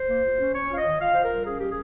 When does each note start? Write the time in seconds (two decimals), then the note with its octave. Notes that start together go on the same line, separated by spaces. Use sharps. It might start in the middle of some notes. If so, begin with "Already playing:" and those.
Already playing: C5
0.08 A#3
0.24 F4
0.39 C#4
0.54 C#4 C#5
0.69 F4 F5
0.77 D#5
0.85 D#3
0.99 F4 F5
1.11 F4 C5
1.23 A#4
1.30 G3
1.45 C#4 G#4
1.57 G3 G4
1.68 G#4